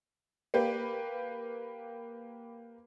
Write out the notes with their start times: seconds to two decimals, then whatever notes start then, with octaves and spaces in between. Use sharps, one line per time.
0.54 A#3 G4 B4